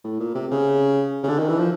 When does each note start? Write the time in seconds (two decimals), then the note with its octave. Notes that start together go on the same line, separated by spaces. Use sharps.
0.04 A2
0.20 A#2
0.35 C3
0.51 C#3
1.24 C#3
1.29 D3
1.39 D#3
1.49 E3
1.59 F3